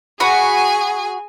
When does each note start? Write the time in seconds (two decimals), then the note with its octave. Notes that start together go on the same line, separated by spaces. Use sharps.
0.20 F#4 G#4 G#5 B5